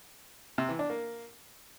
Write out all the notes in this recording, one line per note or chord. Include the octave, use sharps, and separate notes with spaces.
C3
E3
D4
A#3